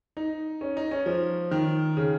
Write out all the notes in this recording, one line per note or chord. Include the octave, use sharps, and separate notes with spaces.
D#4
C#4
D#4
C#4
F3
D#3
C#3